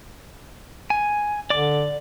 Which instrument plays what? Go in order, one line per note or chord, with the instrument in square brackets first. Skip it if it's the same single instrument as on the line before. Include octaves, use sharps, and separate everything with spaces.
[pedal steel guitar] G#5
[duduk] D3 [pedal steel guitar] D5 D6